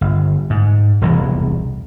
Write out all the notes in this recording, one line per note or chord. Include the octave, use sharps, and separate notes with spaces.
G1
G#2
E1 C2 E3